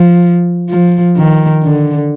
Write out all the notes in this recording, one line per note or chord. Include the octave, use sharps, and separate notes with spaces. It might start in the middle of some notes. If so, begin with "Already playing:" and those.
Already playing: F3
F3
D#3
D3